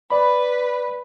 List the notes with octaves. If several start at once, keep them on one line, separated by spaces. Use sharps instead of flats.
B4 D5 B5